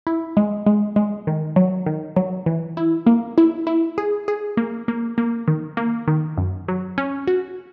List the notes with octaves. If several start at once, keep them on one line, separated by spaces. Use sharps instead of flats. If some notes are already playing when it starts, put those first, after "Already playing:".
E4
G#3
G#3
G#3
D#3
F#3
D#3
F#3
E3
E4
A#3
E4
E4
G#4
G#4
A#3
A#3
A#3
D#3
A#3
D#3
F#2
F#3
C#4
F#4